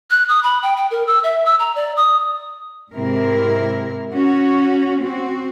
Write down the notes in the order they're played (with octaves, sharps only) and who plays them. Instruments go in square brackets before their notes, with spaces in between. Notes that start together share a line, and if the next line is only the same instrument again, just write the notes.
[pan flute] F#6
D#6
B5
G5
G5
A#4
E6
E5
E6
A#5
D5
D#6
[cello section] G#2 C3 G#3 C4 E4 A#4
C#4 F#4
C4 F#4